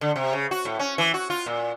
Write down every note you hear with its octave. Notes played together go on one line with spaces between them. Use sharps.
D3
C3
C#3
F#4
A2
C#4
E3
F#4
F4
A#2